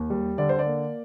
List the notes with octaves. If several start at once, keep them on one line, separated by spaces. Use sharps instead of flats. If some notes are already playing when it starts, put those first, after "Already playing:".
Already playing: D#2
G3
D3 D5
C5
D5
A#3